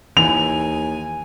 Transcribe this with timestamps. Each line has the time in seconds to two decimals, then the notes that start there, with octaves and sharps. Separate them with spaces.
0.17 D#2 E3 G#5 F7